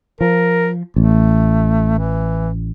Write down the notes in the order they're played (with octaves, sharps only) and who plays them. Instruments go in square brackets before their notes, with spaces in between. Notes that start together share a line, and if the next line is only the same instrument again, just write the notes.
[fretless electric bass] F3 [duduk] A#4
[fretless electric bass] A1 [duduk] A3
[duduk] E3